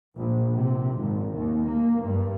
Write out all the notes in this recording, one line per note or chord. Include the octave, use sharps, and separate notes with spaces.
A#1
C3
G#1
D#2
A#3
G2